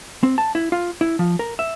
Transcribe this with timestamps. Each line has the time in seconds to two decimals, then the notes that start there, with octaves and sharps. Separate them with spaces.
0.23 C4
0.38 A5
0.55 E4
0.72 F4
1.01 E4
1.19 F3
1.39 A#4
1.59 E5